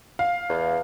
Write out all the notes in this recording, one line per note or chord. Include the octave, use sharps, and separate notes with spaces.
F5
E2